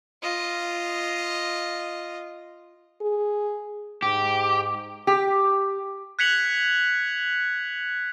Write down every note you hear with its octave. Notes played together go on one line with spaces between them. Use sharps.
F4 D#5
G#4
G#2 G4
G4
F#6 G#6 B6 C#7 F7 F#7